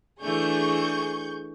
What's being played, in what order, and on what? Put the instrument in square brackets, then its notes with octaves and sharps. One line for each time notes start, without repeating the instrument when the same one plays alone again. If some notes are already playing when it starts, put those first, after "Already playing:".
[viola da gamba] E3 A3 D4 [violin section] G#4 C#6 G6